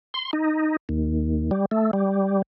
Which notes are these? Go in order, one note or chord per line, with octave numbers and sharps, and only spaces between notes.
C6
D#4
D#2
G3
A3
G3